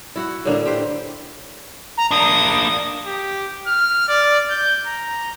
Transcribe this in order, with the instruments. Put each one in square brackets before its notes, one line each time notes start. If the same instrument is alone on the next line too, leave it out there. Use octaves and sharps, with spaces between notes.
[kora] E4 F#4 F#5
A2 D3 A#3 D4
G4 C5
[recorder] A#5
[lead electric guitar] A#3 D4 [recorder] D#6
[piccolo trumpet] G4
F6
D5
G6
A#5